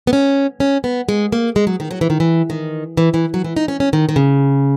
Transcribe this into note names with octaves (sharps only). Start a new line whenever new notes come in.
B3
C#4
C#4
B3
G#3
A#3
G#3
F#3
D#3
F#3
E3
D#3
E3
D#3
E3
E3
F#3
E3
D#4
C#4
C#4
D#3
D#3
C#3